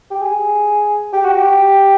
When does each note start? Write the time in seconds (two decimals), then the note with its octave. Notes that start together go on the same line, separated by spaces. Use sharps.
0.11 G4
0.22 G#4
1.13 G4
1.25 F#4
1.36 G4